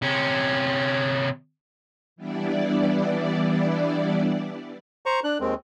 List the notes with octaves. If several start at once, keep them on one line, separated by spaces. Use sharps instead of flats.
C3 C#4
E3 G3 B3 D4 E4 D5
C5 A#5 C#6
D4 F#6
D#2 D#3 G#3 C4